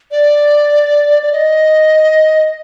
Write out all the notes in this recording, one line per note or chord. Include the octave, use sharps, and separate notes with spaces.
D5
D5
D#5